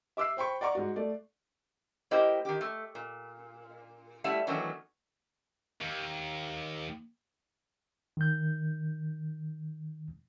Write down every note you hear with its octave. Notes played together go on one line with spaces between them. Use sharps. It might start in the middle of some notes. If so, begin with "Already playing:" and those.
E5 D6 E6 F#6 C7
C5 G5 B5 C#6
D5 F#5 A#5 C#6 D6
G#2 F#4
A3 D5
A#3 E4 G4 C5 D#5 G5
D#3 G4
A3
A#2
G3 A3 E4 E5 F#5
D#3 E3 F#3 A3 B3 D4
D#2
D#3 G6